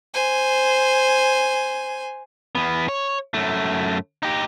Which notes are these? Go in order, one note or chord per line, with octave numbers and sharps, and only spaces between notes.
C5 G#5
E2 B3
C#5
F#2 A3
D#4 G4